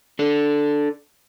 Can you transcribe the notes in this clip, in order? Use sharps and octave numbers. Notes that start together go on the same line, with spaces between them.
D4 A4